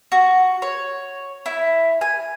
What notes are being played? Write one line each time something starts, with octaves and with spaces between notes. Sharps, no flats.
F#4
C#5
E4
G#5